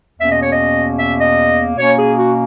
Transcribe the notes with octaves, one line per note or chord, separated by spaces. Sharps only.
E2 B2 A#3 C#4 E5
D#5
C#5
D#5
E5
D#5
B2 A#3 C#4 C#5
G#4
F#4